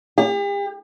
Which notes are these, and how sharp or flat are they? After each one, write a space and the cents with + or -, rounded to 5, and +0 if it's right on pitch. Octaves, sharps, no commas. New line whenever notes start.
G4 +45